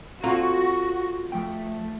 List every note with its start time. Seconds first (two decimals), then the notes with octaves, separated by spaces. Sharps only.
0.24 C4 F4 F#4 A4 A#5
1.32 F3 A3 G5